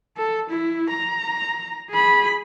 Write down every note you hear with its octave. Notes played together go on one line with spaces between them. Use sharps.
A4
E4
A#5
G#4 B5